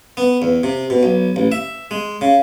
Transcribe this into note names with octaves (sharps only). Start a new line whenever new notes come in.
B3
E2
C3
B2
B1
A1
E5
G#3
C#3